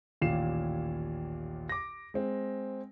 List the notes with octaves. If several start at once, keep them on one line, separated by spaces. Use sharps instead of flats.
A1 D#2 A#2 F5 C7 E7
D6 A#6
G#3 C4